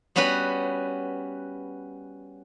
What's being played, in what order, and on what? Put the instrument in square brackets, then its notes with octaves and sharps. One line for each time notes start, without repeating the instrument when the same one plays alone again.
[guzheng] G3 B3 C#4 F#4 B4